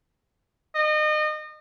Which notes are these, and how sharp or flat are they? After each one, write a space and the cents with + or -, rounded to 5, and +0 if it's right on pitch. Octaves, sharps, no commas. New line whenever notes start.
D#5 -30